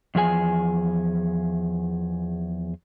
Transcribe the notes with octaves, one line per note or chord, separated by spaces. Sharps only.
E2 F3 G#4 G#5